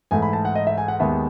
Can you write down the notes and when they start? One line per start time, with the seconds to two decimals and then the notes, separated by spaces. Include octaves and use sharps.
0.11 G#2 E3 A3 G#5
0.22 B5
0.33 A5
0.45 F#5
0.55 D#5
0.67 E5
0.78 G#5
0.88 F#5
0.99 D#2 D#3 G#3 B3 E5